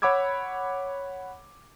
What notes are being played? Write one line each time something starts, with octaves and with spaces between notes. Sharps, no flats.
C#5 F#5 B5 D6 E6 G#6